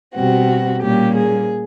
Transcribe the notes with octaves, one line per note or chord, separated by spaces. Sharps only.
B2 G3 C4 F#4
A#2 G3 A#3 C#4 G4
G#4